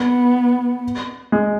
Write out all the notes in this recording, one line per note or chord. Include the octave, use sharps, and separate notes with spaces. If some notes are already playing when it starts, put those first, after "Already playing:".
Already playing: B3
G#3